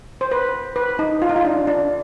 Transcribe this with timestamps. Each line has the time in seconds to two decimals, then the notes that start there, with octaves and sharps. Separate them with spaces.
0.21 C5
0.31 B4
0.76 B4
0.99 D#4
1.22 F4
1.29 D#4
1.36 F4
1.45 D4
1.67 D4